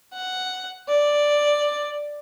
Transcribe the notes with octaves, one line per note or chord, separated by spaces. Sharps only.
F#5
D5